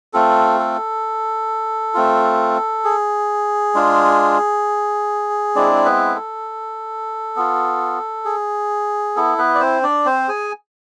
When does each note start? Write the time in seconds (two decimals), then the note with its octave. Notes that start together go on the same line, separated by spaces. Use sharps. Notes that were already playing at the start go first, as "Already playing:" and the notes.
0.13 A3 C4 F4 A4
0.59 A4
1.94 A3 C4 F4
2.84 G#4
3.75 G#3 D4 F4
5.55 G#3 C4 D4 E4 D5
5.85 B3 B4
6.15 A4
7.36 B3 F4
8.25 G#4
9.16 B3 E4 A4
9.38 B3 B4
9.55 D5
9.60 C4 C5
9.83 D4 D5
10.06 C4 C5
10.28 G#4 G#5